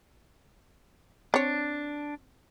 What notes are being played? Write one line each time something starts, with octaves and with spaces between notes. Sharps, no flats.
C4 D4 C#5